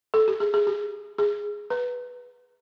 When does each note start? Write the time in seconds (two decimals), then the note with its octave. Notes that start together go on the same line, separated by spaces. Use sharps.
0.14 A4
0.28 G4
0.40 G#4
0.54 G#4
0.67 G4
1.18 G#4
1.70 B4